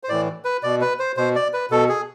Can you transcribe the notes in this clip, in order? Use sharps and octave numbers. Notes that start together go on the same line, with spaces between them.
C5
A2 E3 D5
B4
B2 D5
B4
C5
B2 C5
D5
B4
B2 A4
G#4